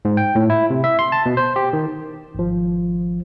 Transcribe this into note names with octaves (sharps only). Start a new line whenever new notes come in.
G#2
G5
A2
E4
C3
E5
C6
A5
B2
C5
G4
D#3
G#1 F3